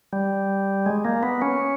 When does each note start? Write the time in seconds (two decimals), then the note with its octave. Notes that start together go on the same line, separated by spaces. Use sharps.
0.13 G3
0.86 G#3
1.05 A#3
1.23 B3
1.42 C#4